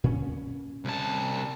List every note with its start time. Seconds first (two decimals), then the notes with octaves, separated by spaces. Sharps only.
0.04 A#2 C#4
0.85 C2 A5